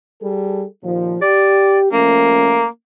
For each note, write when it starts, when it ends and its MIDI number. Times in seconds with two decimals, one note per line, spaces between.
0.22 0.65 55
0.22 0.65 68
0.22 0.65 69
0.83 1.16 39
0.83 1.16 46
0.83 1.16 53
1.22 1.89 67
1.22 1.78 74
1.92 2.64 53
1.92 2.64 57
1.92 2.66 58
1.92 2.64 61